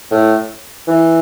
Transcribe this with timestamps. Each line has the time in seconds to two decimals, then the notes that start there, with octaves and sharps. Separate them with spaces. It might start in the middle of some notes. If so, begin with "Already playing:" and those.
0.11 A2
0.88 E3